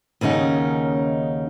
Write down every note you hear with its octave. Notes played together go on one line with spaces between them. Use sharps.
D#2 C#3 C#4 D#4 F#5